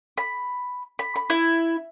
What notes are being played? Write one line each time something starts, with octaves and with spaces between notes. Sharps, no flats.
B5
B5
B5
E4